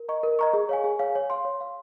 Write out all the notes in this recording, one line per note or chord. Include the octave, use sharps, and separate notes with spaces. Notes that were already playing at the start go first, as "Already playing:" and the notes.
Already playing: A#4
D#5 A#5 C#6
A#4
D#5 A#5 C#6
G#4
C#5 F5 G#5
G#4
C#5 F5 G#5
C#5
F5 C6
C#5
F5 C6